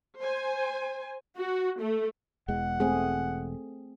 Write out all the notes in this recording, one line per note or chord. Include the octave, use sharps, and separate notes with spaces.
C5 G#5
F#4
A3
E1 E2 G#3 F#5
A3 C4 G#4